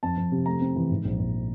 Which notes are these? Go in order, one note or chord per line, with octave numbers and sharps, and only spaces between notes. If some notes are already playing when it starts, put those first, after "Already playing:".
F2 A5
F2
C3
A3 A#5
C4
E3
G#2
A#1
A#1